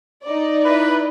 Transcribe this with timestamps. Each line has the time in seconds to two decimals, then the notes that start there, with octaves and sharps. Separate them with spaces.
0.24 D#4 D5
0.65 E4 B4